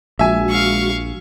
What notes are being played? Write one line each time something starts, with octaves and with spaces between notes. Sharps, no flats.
A#1 G#3 F#4 E5 G#5
F5 C#6